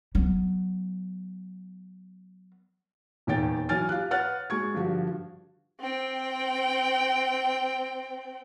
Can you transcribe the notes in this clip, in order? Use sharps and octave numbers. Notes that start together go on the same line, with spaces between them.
F#3 B3
D#1 E2 D#3 C#5 G5 A6
E3 F#3 C#5 G#5 F6 A6
F4 G4 F#6
B4 C#5 F#5 F6 F#6 A6
G#3 F#4 C#6 G#6
G2 D3 F3 F#4 G4
C4 G5